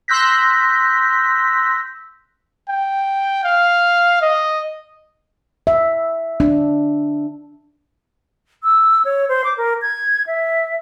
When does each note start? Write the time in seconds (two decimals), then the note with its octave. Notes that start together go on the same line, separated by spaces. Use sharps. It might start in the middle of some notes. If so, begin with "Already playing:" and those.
0.08 C6 E6 F#6 G6 A#6 B6
2.69 G5
3.44 F5
4.22 D#5
5.67 E5
6.40 D4
8.63 E6
9.05 C#5
9.29 C5
9.44 D6
9.57 A#4
9.82 G#6
10.27 E5